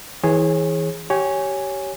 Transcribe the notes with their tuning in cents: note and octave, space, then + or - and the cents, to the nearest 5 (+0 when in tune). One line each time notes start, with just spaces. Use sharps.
E3 -25 G#4 +0 C#5 -35
G4 -25 C#5 +0 G#5 -5